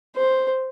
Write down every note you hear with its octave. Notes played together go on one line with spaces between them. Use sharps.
C5